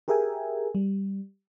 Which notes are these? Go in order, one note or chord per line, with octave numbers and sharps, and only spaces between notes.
G4 G#4 A#4 E5 G5 G#5
G3